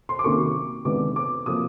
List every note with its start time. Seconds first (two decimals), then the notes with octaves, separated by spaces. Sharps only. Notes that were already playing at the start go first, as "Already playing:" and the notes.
0.09 C6
0.19 D6
0.24 C3 D#3 F#3 A#3 C#4 C#6
0.85 C3 D#3 G#3 B3 D4 D6
1.16 D6
1.46 C3 F3 A#3 D#6